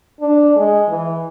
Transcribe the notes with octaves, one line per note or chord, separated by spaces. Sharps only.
D4
G#3
E3